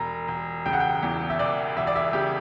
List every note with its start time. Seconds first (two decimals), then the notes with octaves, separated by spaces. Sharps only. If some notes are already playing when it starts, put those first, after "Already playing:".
Already playing: E1 A#5
0.28 E1
0.66 C#3 G5
0.73 F#5
0.80 G5
1.03 E2
1.30 E5
1.39 E1 D5
1.76 E1 E5
1.87 D5
1.96 E5
2.13 C#3 G4